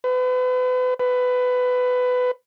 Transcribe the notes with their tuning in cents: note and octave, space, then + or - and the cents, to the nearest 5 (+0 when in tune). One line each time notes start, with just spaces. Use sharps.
B4 +35
B4 +15